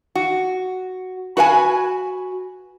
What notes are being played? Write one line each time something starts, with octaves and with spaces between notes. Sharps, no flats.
F#4
F#4 B4 F5 G#5